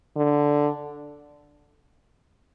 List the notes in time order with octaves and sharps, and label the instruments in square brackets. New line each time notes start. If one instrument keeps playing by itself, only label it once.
[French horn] D3